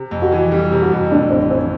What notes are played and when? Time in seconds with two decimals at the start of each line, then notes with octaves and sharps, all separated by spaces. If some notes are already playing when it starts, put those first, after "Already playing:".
Already playing: C3
0.11 F2
0.22 F#4
0.32 E3
0.52 G3 G4
0.72 C3
0.82 F#4
0.92 F2
1.11 A2 D4
1.31 A1 C4
1.50 E3 C4